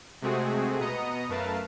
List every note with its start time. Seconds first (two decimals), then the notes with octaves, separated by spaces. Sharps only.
0.22 C3 G#3 A3 C4 F#4 G#4
0.80 B2 B3 D#5 A#5 D#6 C#7
1.28 F#2 A3 A#4 B4 F5 A5